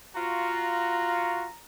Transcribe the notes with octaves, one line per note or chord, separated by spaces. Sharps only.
F4 F#4 A#5